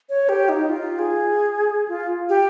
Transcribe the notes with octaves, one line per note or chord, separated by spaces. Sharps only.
C#5
G4
D#4
F4
G#4
F4
G4